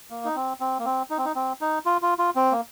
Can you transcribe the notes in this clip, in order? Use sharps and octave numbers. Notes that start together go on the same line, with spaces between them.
A#3
D#4
C4
C4
A#3
C4
D#4
C4
D#4
C4
D#4
F4
F4
F4
C4
A#3